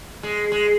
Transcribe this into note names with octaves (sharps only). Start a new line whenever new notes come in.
G#3
G#3